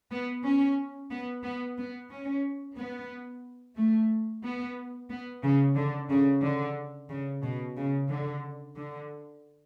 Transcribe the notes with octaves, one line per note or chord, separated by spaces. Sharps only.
B3
C#4
B3
B3
B3
C#4
B3
A3
B3
B3
C#3
D3
C#3
D3
C#3
B2
C#3
D3
D3